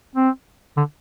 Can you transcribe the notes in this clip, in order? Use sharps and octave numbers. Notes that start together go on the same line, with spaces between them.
C4
D3